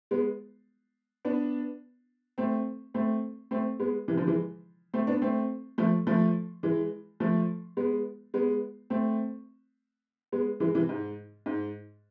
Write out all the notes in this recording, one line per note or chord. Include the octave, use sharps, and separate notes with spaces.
G#3 B3
B3 D4
A3 C4
A3 C4
A3 C4
G#3 B3
C3 E3
D3 F3
E3 G#3
A3 C4
B3 D4
A3 C4
F3 A3
F3 A3
E3 G#3
F3 A3
G#3 B3
G#3 B3
A3 C4
G#3 B3
E3 G#3
C3 E3
G#2
G#2